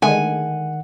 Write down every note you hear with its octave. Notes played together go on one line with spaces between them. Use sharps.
D3 D#3 G#3 A3 F#5 G#5